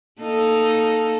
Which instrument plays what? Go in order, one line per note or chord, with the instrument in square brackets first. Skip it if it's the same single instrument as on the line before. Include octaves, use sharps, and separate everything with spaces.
[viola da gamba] A#3 D#4 A4